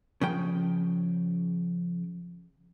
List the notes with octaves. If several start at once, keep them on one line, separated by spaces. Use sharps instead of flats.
C#3 F3 G5